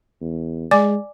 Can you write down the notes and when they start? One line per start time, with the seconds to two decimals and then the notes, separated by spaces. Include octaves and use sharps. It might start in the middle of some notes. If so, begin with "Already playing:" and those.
0.21 E2
0.71 G#3 D5 G#5 D6